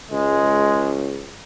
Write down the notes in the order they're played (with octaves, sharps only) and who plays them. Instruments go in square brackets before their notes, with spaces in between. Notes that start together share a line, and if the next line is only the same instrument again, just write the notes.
[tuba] C#2 [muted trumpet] G#3